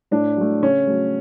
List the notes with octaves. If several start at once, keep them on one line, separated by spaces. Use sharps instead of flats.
A2 D4
F#3 A3
C#3 C#4
F#3 A3